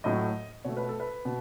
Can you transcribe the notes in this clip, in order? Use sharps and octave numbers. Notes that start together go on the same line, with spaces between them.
A2 F#3 A3 D#5
B2 A3 C#5
B4
A4
B4
B2